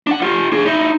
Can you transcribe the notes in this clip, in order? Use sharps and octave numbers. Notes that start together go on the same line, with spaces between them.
D4 F#5
F4 G4
D4 G#4
D#4 E4